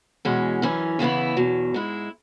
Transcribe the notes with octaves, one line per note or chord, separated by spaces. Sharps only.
E2 B2 G#3 C#4
F#2 E3 C#4
E2 C#3 E3 B3 E4
E2 B2 F#3
G#2 G#3 E4